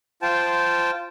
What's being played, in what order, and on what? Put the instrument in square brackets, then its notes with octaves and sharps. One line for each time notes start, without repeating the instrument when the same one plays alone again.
[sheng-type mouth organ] F4 C5 G5 A5